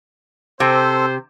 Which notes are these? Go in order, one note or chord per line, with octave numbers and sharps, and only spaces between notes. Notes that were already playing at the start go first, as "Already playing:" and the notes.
C3 C4 A4 C5